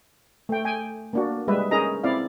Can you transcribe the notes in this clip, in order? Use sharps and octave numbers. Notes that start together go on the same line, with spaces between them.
A3 G5
G5 G#5
A#3 D4 F#4
G3 G#3 B4 E5
C#4 D#4 G#4 A#4 D#5 A#5
C4 E4 D5 F5